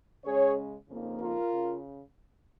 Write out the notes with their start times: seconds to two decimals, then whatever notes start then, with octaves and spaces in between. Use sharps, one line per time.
0.24 C#3 G#3 C#4 G#4 C#5
0.88 F2 C#3 F3 A#3 D#4
1.19 F4 A#4
1.50 C#3